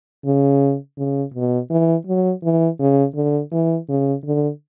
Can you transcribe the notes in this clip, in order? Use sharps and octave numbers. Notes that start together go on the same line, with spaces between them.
C#3
C#3
B2
E3
F#3
E3
C#3
D3
E3
C#3
D3